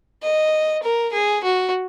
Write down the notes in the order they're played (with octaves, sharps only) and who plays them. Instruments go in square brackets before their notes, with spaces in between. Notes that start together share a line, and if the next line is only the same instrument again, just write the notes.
[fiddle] D#5
A#4
G#4
F#4